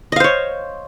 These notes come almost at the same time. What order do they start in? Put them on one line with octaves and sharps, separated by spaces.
D#5 F5 C5 C#5